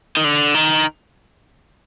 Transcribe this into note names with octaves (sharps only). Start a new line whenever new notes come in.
D#3
D3
D#3